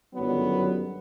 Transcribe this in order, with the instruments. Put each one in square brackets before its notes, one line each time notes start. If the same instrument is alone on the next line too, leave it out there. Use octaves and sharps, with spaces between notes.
[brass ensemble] G1 F#2 D#3 F#3 B3